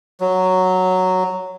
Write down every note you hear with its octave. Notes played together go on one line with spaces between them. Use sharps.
F#3